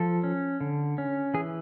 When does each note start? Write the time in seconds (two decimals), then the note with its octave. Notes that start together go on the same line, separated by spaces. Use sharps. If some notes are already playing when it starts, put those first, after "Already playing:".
Already playing: F3 A4
0.23 C#4
0.60 D3
0.98 C#4
1.34 E3 G#4